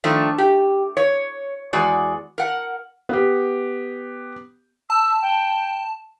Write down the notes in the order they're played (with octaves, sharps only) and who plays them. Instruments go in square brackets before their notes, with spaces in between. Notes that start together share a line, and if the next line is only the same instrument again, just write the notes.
[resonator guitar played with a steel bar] D#3 F3 A3 D4
G4
C#5
E2 G#3 F#4 D5
A#4 F#5
[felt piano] B3 G4
[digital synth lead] A5 [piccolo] E6
[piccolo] G5